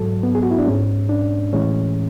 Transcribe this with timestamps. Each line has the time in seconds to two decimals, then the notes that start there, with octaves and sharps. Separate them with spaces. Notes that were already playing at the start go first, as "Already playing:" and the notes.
Already playing: G#2 F#3 A4
0.23 B3
0.35 G#4
0.43 F#4
0.51 E4
0.59 D4
0.66 G#2 G#3 C#4
1.09 D4
1.53 A2 E3 G#3 C#4